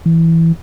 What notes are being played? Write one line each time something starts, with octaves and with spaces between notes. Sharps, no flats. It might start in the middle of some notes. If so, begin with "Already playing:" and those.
E3